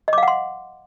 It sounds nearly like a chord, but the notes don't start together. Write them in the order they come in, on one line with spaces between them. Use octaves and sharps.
D#5 D6 F5 F#5 C6